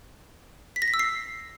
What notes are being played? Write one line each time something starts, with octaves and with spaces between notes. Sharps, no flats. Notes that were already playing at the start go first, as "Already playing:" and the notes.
B6
A#6
B6
E6
C7